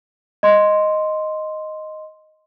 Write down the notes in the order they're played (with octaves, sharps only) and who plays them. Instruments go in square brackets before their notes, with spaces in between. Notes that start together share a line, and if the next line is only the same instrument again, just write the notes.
[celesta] D#5 C6